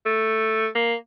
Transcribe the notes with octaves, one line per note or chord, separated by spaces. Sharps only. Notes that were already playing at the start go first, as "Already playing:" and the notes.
A3
A#3